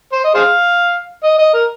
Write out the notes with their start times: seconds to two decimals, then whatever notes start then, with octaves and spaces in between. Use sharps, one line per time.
0.13 C5
0.24 D#5
0.35 G#4 C5 F5
1.24 D#5
1.38 D#5
1.54 A#4